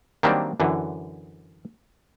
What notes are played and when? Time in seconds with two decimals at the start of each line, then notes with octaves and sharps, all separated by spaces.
0.23 D#3 F#3 G3 A#3 C4 D4
0.60 F#2 D3 E3